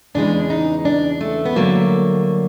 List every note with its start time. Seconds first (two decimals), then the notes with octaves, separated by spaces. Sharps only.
0.14 E2 C#3 E3 G#3 D4
0.50 D#4
0.85 D4
1.21 A3
1.45 B3
1.55 G2 D3 F#3 A3 A#3